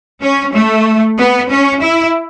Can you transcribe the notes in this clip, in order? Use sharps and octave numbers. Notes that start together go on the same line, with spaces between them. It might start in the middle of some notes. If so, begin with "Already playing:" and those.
C#4
A3
B3
C#4
E4